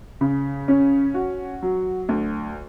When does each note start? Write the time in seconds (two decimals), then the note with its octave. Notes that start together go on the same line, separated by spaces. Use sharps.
0.21 C#3
0.68 C#4
1.14 F#4
1.62 F#3
2.09 D2